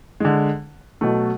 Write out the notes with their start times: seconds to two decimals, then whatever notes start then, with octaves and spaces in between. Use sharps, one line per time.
0.20 D3 G#3
1.01 B2 F#3 A3